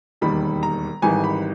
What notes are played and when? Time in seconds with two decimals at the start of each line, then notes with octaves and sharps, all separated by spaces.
0.21 E1 D#2 D#3 G3 B5
0.63 A#5
1.02 G#1 G#2 E3 G3 G#5
1.24 B5